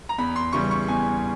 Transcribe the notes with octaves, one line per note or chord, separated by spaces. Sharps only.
A#5
E2 B5
C6
C#3 E3 G3 C#6
C#6
E2 G#5